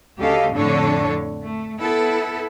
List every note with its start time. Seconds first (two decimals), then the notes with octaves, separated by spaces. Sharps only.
0.18 D2 C#3 G4 A4 D#5 F5
0.53 F2 A2 D3 D4 A4 C#5
1.42 A3
1.79 B3 E4 A4